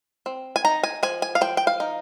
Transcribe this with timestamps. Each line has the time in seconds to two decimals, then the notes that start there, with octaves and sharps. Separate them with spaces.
0.26 C4
0.56 G#5
0.64 D#4 A#5
0.83 G#5
1.03 F3 G#5
1.22 G#5
1.35 F5
1.41 F3 G5
1.57 G5
1.67 F5
1.80 D#4